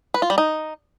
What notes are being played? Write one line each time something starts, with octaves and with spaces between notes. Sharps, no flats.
B4
F4
G3
D#4